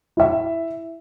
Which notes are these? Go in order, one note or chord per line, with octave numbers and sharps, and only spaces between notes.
E4 E5